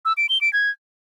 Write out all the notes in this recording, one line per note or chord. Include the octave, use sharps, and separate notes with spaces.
E6
D7
G7
D7
G#6